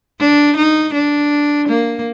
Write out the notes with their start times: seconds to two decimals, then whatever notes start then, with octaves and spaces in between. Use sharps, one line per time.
0.20 D4
0.57 D#4
0.94 D4
1.69 A#3